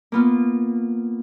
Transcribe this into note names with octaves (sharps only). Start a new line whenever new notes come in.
A#3 B3 F4